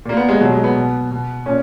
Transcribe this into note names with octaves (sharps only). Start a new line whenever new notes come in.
A#2 A#3
B3
G#3
B2 F#3
G#3
B3
B2
B2
A#2 C#4